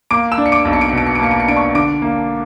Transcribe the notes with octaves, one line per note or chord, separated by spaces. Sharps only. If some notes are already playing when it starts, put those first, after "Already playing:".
A#3 D6 D7
E6 E7
D4
C#7
D6 D7
B1
C#7
D7
C#7
B2 D7
C#7
D7
A#3 C#7
D7
C#7
D4 D7
C#6 C#7
D3 D6 D7
A#3